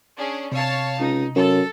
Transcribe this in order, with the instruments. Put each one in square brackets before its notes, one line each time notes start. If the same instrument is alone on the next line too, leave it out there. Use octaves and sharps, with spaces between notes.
[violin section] C#4 D4 G#4
[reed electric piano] C3 [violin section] C#5 F5 A5
[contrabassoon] C#2 [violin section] D#4
[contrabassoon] F#2 [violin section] A4